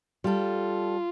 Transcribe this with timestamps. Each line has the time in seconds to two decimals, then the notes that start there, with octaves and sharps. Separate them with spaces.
0.24 G3 F4 A4